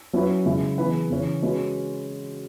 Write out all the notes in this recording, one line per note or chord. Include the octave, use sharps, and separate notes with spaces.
F#3 C#4 E4 B4
C#3 G#3 E4
E3 B3 G#4 B4
C#3 E3 C#4
G#3 C#4 F#4 B4